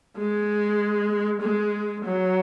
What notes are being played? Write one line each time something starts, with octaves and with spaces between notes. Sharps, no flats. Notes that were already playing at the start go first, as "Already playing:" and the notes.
G#3
G#3
F#3